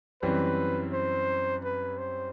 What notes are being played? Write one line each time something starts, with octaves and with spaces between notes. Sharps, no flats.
F#2 E3 G3 C4 B4
C5
B4
C5